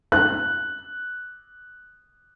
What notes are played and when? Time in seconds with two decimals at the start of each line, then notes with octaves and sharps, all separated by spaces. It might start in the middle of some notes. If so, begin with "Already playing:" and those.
0.12 F#6